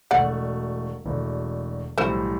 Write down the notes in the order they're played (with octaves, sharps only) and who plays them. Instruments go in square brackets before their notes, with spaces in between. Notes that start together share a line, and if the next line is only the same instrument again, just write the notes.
[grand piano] E1 E2 B2 A3 [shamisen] D5 F#5
[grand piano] E1 E2 B2 A3
[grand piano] B1 A2 E3 G3 [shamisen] A4 C5